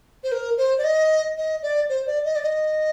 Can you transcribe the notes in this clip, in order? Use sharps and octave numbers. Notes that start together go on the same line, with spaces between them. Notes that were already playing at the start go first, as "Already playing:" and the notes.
C5
A#4
C5
D5
D#5
D#5
D5
C5
D5
D#5
D5
D#5